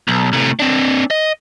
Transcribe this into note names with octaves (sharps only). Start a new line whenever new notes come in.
B1
A2 C3
C4 D4
D#5